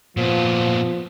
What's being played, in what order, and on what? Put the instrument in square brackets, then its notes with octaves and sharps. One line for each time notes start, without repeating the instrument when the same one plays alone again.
[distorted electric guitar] A#2 B3 [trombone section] F3